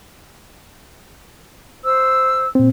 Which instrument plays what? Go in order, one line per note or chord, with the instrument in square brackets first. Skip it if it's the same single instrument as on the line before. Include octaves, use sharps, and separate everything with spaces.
[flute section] C5 E6
[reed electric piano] A#2 C4